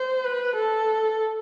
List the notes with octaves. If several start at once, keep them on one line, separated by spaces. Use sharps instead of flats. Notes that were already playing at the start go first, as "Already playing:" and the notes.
Already playing: C5
B4
A4